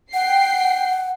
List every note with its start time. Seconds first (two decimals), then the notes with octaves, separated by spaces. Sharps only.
0.14 F#5 G5 C7